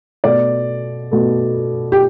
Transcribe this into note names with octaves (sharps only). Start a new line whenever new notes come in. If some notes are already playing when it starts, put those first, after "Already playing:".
B2 A3 D5
B2 A3
G4